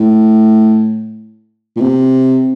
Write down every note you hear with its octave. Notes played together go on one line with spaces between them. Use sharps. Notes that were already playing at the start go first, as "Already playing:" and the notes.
Already playing: A2
A#2
C3